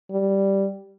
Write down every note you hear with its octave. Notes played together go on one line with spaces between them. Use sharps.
G3